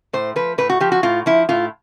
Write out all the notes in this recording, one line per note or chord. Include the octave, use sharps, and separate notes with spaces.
A2 C5
F3 B4
A2 B4
F#4
F3 G4
F#4
A2 F4
F3 E4
A2 F4